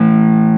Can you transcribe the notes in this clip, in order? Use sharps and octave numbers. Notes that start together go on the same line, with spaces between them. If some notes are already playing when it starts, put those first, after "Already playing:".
Already playing: A2 E3